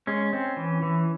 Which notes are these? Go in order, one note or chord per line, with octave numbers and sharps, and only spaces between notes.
G#3 C#4
C4
E3
E3